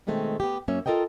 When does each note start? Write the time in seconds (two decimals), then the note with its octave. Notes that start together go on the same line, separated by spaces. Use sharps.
0.07 B2 D#3 G#3 A3 C4
0.40 B3 G4
0.68 F#2 F#3 A#3 C#4 E5
0.86 F4 A4 A#4 D#5 G5